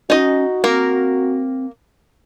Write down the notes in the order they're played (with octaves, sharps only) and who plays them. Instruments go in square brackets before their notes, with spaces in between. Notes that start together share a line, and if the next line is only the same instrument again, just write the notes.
[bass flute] C#4 [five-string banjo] D#4 D#5 [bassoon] F#4
[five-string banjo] A#3 A#4 [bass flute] C4